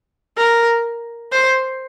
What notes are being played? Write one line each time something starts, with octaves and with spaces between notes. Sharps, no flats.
A#4
C5